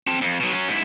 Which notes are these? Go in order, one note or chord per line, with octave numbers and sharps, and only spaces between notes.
C4 A5
F2
B2 F#3
F#3 C#4
G#2 E4